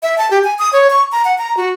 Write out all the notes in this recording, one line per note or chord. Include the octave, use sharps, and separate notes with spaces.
E5
A5
G4
G#5
D#6
C#5
C#6
A#5
F#5
A#5
F#4